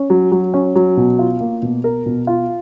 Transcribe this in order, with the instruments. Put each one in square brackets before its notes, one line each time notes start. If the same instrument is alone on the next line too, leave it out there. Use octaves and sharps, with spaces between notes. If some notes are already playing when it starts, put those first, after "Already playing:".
Already playing: [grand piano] C#4
F#3
F#3
C#4
F#3
B2
F4
A#3
B2
A#4
B2
F4